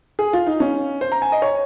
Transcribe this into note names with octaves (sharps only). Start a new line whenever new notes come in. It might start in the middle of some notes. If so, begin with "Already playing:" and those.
G#4
F4
D#4
C#4
C5
A#5
G#5
D#5
C#5